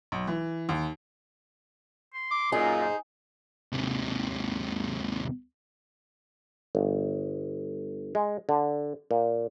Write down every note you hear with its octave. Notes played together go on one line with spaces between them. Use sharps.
B1
E3
D#2
C6
D6
F#2 A#2 D#4 G#4
C5
D#2 C3
G1
G#3
D3
A#2